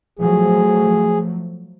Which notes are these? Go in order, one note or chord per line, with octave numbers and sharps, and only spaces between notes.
F3 F#3 A3 G#4